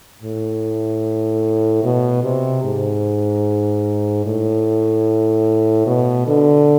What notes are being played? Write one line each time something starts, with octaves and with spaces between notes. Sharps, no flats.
A2
B2
C3
G#2
A2
B2
D3